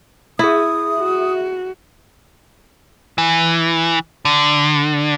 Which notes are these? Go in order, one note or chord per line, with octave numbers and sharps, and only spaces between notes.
E4 G#4 E5 D#6
F#4
E3
D3